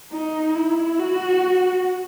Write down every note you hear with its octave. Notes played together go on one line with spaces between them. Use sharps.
D#4
E4
F#4